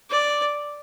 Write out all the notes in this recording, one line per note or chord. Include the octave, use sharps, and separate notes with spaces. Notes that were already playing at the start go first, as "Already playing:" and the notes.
D5